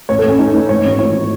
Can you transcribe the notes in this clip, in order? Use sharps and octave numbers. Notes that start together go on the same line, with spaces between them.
A1 C#5
A4
A1
C#4
A1 D#4
A1 B4
G#2 C#5
G#1
E3 C#5